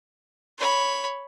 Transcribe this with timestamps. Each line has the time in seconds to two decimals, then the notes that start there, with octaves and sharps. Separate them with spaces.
0.58 C#5 B5